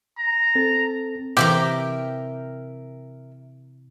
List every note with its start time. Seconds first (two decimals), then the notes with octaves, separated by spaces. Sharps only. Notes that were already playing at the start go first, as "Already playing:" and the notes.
0.18 A#5
0.55 C4 A4 A6
1.37 C3 E3 G4 A#4 E5 G5 D6